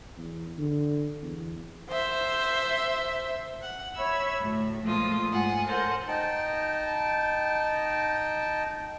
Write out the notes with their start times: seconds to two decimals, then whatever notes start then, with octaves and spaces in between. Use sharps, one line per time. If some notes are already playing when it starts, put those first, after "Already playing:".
0.18 E2
0.58 D3
1.22 E2
1.89 C5 E5
3.61 F#5
3.94 C#5 E5 B5 E6 G#6
4.38 D2 A2
4.84 A#2 F3 G#3 A3 F4 D#6
5.30 G#2 F4 F#5 G#5
5.66 A4 A#4 C5 C#5 F#5 G#5
6.08 D#4 G5 A5